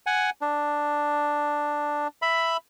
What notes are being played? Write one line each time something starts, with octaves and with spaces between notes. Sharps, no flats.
F#5 G#5
D4
E5 B5